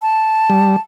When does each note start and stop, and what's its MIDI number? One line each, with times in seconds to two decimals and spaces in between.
0.02 0.80 81
0.50 0.76 55